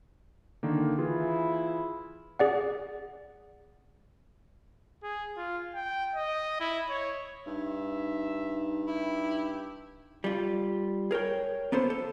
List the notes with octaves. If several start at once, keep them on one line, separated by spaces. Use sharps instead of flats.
D3 D#3 A#3
E3 E4 F4 G#4
G#4 D5 F#5
G#4
F4
G5
D#5
E4
C#5
G2 D#4 E5
E4 G4
G3 F4
G#4 A#4 C#5 G5
A#3 B3 A4 C5
A4